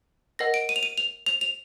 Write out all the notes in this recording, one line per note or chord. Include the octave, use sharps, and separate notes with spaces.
A#4 D#5 F#5 A#6
D7
D#7
F7
D#7
F7
F7
F7